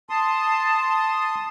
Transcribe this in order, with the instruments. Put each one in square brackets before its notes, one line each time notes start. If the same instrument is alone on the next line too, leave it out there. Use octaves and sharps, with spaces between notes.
[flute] A5 [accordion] C6 D#6